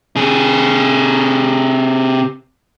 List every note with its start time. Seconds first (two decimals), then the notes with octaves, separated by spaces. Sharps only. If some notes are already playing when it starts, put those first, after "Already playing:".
0.16 C3 G#4